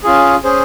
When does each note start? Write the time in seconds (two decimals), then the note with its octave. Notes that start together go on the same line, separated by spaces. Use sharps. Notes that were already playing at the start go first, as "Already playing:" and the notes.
0.04 C#4 F4 G#4
0.44 C#4 G#4 C5